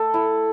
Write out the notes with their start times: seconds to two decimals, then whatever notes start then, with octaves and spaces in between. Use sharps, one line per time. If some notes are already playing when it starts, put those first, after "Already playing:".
Already playing: A3 A4
0.14 E4